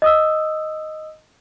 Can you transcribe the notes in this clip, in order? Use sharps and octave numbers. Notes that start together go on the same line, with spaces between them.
D#5 D#6 E6